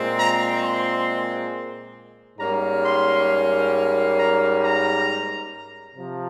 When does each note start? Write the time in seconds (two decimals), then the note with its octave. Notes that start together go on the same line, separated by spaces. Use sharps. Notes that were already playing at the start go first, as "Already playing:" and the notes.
Already playing: A#2 G#3 C4
0.17 A#5
0.61 C6
2.39 G#2 G3 A#3 C#4 A#5
2.84 C6
4.18 A#5
4.63 A#5
5.97 C3 F3